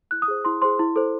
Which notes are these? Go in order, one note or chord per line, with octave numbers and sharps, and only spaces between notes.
E4 F#6
D#6
G#4 C5
E4 C6
G#4 C5 C6
E4
A4 C5